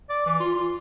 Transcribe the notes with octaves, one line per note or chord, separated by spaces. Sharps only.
D5
E3
F4
F4